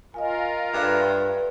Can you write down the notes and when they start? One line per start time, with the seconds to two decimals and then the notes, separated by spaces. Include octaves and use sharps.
0.14 F4 A#4 D#5 F5 G#5
0.73 G2 A4 B4 D5 E5